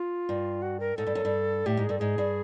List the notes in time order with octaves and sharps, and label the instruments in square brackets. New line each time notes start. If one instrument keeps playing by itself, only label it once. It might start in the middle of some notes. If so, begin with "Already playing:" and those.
Already playing: [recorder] F4
[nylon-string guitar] G2
[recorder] F#4
A#4
[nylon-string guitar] G#2 [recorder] A4
[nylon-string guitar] G2
F#2
G2
[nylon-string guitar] A2 [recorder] G4
[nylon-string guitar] G#2
[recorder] G#4
[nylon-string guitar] G2 [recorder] A4
[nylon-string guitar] G#2 [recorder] G#4
[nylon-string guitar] G2